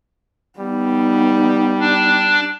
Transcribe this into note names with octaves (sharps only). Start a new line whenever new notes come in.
G3 B3 D#4
D4